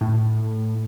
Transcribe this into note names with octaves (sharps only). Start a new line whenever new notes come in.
A2